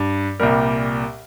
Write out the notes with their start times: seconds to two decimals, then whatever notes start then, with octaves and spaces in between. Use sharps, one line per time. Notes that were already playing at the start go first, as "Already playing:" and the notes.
Already playing: G2
0.40 C2 A#2 G3 A#4